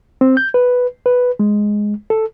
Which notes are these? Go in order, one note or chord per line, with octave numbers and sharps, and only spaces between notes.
C4
G6
B4
B4
G#3
A4